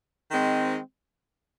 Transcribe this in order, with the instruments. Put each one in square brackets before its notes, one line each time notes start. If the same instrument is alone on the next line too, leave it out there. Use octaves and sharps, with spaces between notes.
[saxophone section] D#3 G#3 C4